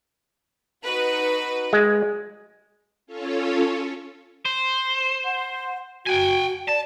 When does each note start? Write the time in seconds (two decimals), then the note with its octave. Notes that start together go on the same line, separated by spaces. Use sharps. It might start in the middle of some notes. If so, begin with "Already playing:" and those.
0.84 D#4 F#4 B4
1.73 G#3
3.07 C#4 F4 A4 C#5
4.45 C5
5.25 F#5
6.06 F#4 G5 G#5
6.68 D5 A5